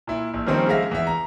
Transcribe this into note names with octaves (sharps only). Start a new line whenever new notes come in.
A#2 E4
A#1
D#3 F3 G3 A#3 C4 C#4
C#3 G#3 E5 F5 A#6
E2 E5
A#5